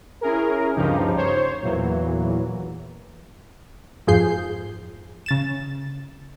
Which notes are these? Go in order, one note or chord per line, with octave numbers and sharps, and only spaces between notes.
C#4 E4 G#4 A#4
D2 G2 C#3 F3 D#4 G4
C5 C#5
E2 A#2 E3 F#3
F2 G#2 F3 G#4 G6 C7
C#3 A6 E7